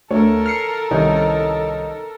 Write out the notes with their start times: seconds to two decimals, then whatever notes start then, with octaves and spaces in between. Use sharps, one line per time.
0.11 D2 A4 A#4 C#5
0.46 F6 C7 C#7
0.91 C2 D#3 C#4 D#4